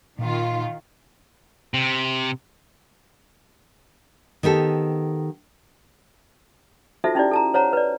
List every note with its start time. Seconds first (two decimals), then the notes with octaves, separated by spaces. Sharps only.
0.19 A#2 D#3 F4
1.74 C3
4.43 D#3 B3 G4 A4
7.04 D#4 F4 F#4 A4 C5 E5
7.15 C#4 D#4 E4 G4 D5
7.31 A4 A5 A#5
7.54 C5 C#5 F#5 A#5
7.73 B4 D5